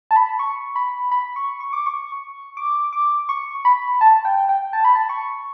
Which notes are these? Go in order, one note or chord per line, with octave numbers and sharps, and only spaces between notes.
A5
B5
C#6
B5
B5
C#6
C#6
D6
C#6
D6
D6
C#6
B5
A5
G5
G5
A5
B5
A5
C#6